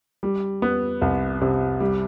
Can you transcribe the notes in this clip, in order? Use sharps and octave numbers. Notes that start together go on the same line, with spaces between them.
G3
B3
C2
C3
G3